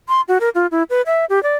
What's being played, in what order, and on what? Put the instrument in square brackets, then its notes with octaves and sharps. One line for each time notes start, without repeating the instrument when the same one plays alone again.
[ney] C6
F#4
A#4
F4
E4
B4
E5
G4
D5